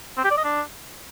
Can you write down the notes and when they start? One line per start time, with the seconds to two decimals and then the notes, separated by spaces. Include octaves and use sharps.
0.17 C4
0.24 G4
0.31 D5
0.37 D#5
0.44 D4